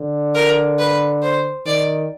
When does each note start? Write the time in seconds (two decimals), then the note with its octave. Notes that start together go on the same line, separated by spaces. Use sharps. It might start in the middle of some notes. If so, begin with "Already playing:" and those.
Already playing: D3
0.35 A#4
0.79 B4
1.22 C5
1.66 D#3 D5